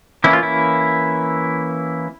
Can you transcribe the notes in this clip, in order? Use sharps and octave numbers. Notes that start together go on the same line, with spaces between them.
E3 A#3 C#4 E4
F4
E4